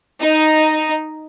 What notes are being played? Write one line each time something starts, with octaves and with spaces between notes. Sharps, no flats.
D#4